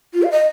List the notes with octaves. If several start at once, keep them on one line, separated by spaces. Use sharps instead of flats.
F4
F5
D#5